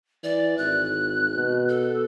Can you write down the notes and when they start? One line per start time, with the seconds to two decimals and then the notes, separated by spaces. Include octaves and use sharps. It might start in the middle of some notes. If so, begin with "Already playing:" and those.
0.24 E3 D5
0.58 G#1 F#6
1.35 B2
1.69 A4